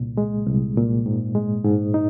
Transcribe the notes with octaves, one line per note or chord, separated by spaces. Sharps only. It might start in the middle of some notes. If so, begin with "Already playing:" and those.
Already playing: C2 A#2
G#3
C2
A#2
G#2
G#3
G#2
D#4